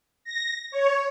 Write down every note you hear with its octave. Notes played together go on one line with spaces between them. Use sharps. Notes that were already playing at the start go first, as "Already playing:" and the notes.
A#6
C#5